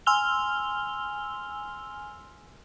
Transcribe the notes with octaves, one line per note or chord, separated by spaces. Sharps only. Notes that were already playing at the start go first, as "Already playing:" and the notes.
G#5 C6 E6 F6 F7 G7